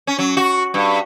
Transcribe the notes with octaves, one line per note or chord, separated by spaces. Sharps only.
C#4
F#3
F#4
G2